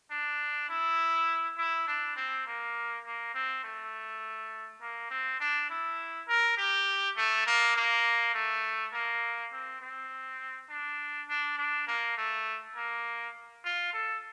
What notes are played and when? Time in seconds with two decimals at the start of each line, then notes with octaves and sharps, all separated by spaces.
0.11 D4
0.69 E4
1.57 E4
1.87 D4
2.16 C4
2.46 A#3
3.05 A#3
3.34 C4
3.63 A3
4.81 A#3
5.10 C4
5.40 D4
5.70 E4
6.28 A#4
6.57 G4
7.16 A3
7.46 A#3
7.76 A#3
8.34 A3
8.92 A#3
9.52 C4
9.81 C4
10.70 D4
11.29 D4
11.58 D4
11.87 A#3
12.17 A3
12.75 A#3
13.64 F4
13.93 A4